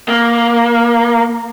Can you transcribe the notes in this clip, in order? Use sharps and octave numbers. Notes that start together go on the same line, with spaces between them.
A#3